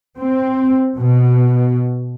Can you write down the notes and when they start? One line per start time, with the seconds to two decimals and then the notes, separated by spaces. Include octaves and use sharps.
0.19 C4
0.98 B2